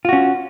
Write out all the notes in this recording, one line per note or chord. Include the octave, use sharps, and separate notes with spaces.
C#4 F4 F#4